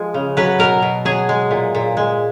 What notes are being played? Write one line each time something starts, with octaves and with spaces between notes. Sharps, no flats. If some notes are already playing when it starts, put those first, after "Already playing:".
Already playing: F3 G#3
C#3
F#3 B4
B2 A#4
B2
F#3 G#4
G#3
A#2
A#2
G#3